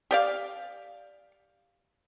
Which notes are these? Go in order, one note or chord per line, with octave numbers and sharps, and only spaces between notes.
G4 D5 F5